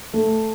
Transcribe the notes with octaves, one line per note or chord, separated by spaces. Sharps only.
A3